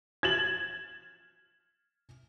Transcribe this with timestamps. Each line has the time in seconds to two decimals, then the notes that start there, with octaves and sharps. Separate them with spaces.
0.23 G#6 A6 E7 F#7